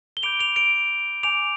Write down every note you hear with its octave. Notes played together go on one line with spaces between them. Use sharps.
G7
B5 D6 G6 D7 F7
D7 F7
D7 F7
G#5 D6 G6 D7 F7